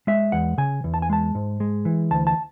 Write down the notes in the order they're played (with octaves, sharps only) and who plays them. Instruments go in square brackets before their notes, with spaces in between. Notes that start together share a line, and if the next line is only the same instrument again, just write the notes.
[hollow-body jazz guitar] G#3 E5
E2 F#5
C#3 G#5
E2
A5
G#5
G#3 A5
G#2
G#3
E3
D2 A5
A5